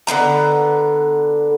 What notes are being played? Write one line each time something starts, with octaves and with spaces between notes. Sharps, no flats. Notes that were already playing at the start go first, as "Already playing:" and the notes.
D3 B3 F4 A#5